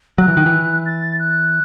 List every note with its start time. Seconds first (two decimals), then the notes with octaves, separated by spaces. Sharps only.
0.18 F#3 F#6
0.28 E3
0.37 D#3
0.46 E3
0.86 A6
1.19 F#6